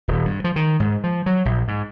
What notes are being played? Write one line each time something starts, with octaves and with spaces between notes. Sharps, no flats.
D#1
G2
F3
D#3
G#2
F3
F#3
A#1
G#2